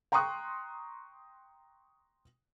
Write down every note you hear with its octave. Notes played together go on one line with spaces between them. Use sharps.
G5 A#5 C6 C#6 D#6 F#6